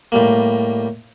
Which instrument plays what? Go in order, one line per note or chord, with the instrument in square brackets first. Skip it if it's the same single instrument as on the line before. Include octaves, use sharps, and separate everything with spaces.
[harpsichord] A2 G3 A#3